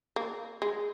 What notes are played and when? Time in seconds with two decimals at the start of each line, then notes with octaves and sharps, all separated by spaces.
0.16 A#3
0.62 G#3